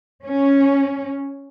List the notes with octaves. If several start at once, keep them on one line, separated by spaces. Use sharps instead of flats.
C#4